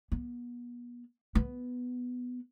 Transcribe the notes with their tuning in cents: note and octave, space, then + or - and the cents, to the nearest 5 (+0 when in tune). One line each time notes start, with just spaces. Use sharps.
B3 -35
B3 +5